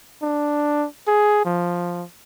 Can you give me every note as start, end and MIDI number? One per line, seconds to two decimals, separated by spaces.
0.22 0.86 62
1.07 1.44 68
1.45 2.04 53